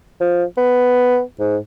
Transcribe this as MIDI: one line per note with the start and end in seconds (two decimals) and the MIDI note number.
0.20 0.44 53
0.57 1.21 59
1.40 1.57 44